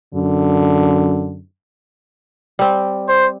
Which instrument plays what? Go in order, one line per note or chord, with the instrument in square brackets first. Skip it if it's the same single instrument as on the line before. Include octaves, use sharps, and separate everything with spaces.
[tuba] F#2 [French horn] D3
[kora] G3 C4
[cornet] C5